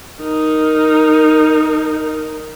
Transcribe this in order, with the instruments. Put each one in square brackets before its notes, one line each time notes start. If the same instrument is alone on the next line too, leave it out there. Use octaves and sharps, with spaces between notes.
[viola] D#4 A#4